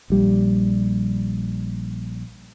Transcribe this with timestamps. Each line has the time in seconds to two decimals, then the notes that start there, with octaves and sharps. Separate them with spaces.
0.10 A#1 G3